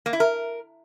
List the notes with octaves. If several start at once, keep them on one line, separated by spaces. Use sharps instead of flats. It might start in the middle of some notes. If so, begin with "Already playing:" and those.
A#3
E4
A#4